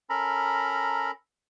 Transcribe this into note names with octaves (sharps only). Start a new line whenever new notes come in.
C#4 A4 A#4 A#5 B5